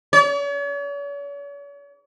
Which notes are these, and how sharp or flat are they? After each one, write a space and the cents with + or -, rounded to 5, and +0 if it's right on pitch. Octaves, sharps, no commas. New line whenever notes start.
C#5 +45